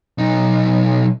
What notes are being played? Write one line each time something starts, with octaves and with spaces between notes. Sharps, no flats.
B1 D#4